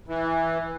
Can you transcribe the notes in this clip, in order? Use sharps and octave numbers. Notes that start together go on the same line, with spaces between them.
E3